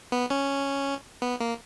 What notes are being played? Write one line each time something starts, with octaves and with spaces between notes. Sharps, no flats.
B3
C#4
B3
A#3